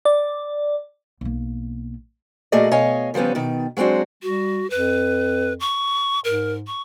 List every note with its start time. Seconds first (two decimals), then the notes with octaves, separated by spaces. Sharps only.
0.05 D5
1.21 B1 A#3
2.52 A#2 A3 F#4 G#4 D5 D#5
2.71 B2 C#5 D#5 F5 G#5
3.14 C#3 F3 G3 B3 C#4
3.35 B2 D#3
3.77 F#3 G#3 C4 D4 F#4
4.23 G3 F#4
4.70 F2 B4
5.60 C#6
6.25 G#2 A#4
6.67 C#6